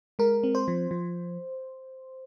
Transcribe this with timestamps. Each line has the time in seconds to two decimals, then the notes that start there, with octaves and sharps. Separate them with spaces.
0.19 G#3 A#4
0.43 C4
0.55 C5
0.68 F3
0.91 F3